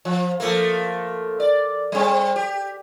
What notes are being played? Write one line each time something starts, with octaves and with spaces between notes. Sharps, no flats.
F3
F3 A3 A#3
D5
G3 C4
G4